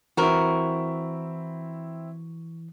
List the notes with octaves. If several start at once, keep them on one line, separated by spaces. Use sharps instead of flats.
E3 C4 E4 F#4 A#4